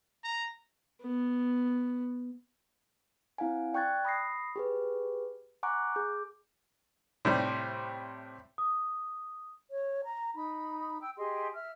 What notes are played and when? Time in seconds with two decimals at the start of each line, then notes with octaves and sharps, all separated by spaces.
0.24 A#5
1.02 B3
3.38 C4 E4 F5 F#5 G#5
3.74 D5 G5 C#6 F#6 G#6 A6
4.05 B5 D#6 A#6 C7
4.56 G4 G#4 B4
5.63 F#5 G#5 A#5 C#6 D6 F#6
5.96 G#4 D6 G6
7.25 A2 C3 G3
8.58 D#6
9.71 C#5
10.05 A#5
10.36 D#4 B5
11.01 G5 E6
11.18 G4 G#4 D#5 C6
11.54 E5 F6